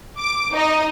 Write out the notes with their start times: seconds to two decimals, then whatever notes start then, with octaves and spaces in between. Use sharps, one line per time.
0.19 D6
0.52 D#4 D#5